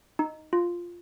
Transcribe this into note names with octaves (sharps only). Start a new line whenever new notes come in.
D#4
F4